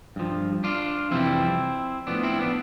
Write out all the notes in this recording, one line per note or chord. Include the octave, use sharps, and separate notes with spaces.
G2 F3
D4 F4
F2 C3 E3 G3 C4 E4
A2 F3 B3 D4
C4 E4
B3 D4